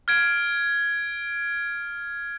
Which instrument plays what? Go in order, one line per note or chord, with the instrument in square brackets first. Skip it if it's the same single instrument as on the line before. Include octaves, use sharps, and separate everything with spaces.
[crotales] F6 G#6 D7